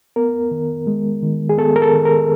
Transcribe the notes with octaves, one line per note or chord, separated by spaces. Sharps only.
B3 A#4
D#3
G#3
D#3
G#4
B3 A4
A#4
A4
D#3
A#4